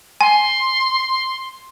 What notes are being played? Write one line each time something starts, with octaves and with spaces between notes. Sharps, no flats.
G#5 C6